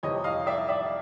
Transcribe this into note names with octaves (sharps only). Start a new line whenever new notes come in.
F2 C3 E3 C#5 D#5
D#5 F5
D5 E5
D5 E5